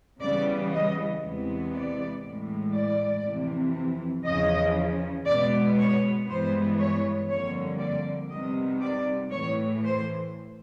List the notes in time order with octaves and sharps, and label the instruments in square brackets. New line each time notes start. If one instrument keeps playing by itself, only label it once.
[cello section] C#3 E3 G3 B3 D5
D#5
E2 C3 E3 G#3 B3
D5
A2 E3 G#3
D5
F2 C3 E3
E2 C#3 F3 D#5
B2 G#3 B3 D5
C#5
G2 E3 G#3 B3 C5
C#5
F2 D3 G3 A#3 C#5
D5
C3 D#3 G3 B3 D#5
D5
A2 E3 A3 C#5
C5